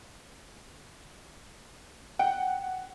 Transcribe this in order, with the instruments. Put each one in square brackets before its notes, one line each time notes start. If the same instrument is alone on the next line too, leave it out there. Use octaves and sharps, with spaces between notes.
[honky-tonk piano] F#5 [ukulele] G5